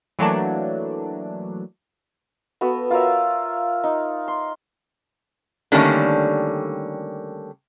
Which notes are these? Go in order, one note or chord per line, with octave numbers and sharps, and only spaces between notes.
E3 F#3 A3 A#3 D4
B3 F#4 A4 B4
F4 A#4 C#5 E5
D#4
C6
D3 D#3 G3 A3 A#3 C#4